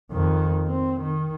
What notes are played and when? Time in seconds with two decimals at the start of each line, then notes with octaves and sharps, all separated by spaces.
0.12 F2 D#3
0.67 C4
1.01 D#3